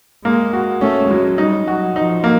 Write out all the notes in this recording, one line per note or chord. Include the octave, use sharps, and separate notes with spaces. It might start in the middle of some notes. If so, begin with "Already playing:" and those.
G#3 A#3
F#4
A3 C#4
F#3 G#3
G3 D#4
F#3 F#4
F3 D#4
A#3